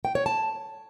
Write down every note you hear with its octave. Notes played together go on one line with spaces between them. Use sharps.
G5
C#5
A5